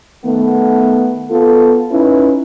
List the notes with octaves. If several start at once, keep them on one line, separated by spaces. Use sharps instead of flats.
D#3 A3 B3
B3 F4 A4
C#4 D#4 E4 B4